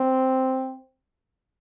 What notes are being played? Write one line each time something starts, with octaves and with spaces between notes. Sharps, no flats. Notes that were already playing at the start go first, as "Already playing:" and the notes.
Already playing: C4